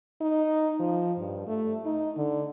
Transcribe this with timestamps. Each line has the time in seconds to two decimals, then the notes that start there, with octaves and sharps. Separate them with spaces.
0.21 D#4
0.80 F3
1.18 G2
1.47 A3
1.85 D#4
2.17 D3